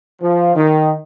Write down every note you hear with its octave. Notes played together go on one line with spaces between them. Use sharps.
F3
D#3